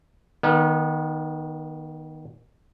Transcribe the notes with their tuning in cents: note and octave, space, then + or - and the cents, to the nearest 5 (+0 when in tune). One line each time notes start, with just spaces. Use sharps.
D#3 +0 B3 -35